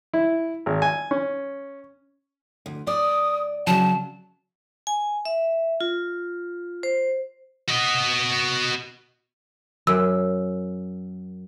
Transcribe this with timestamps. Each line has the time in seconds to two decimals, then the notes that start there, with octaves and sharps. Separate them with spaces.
0.14 E4
0.66 G#1
0.82 G#5
1.11 C#4
2.66 D2
2.87 D5 D#6
3.67 C#3 F#3 A5
4.87 G#5
5.26 E5
5.81 F4
6.83 C5
7.69 F#4 D#5
9.87 F#2 E6